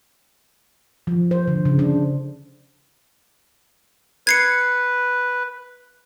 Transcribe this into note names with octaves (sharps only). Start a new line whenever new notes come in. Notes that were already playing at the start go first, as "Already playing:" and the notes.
F3
C5
D3
C#3
D4
B4 G#6 C7 C#7